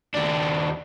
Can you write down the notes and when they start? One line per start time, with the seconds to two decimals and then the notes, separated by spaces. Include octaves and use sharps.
0.15 D#2 D4